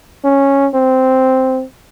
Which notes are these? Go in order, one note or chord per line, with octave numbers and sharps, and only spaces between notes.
C#4
C4